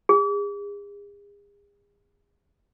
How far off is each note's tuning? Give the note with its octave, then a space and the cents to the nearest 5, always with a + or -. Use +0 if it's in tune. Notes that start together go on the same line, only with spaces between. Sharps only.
G#4 -40